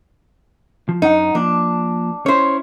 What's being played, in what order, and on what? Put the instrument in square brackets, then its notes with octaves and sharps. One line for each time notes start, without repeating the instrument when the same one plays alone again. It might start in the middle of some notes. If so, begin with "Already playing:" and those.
[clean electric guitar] F3
[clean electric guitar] F#2 F#5 [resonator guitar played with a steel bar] D#4
[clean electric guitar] F3 A#3 [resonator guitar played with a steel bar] D4
[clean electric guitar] C#4 E4 [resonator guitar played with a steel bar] C5 C#5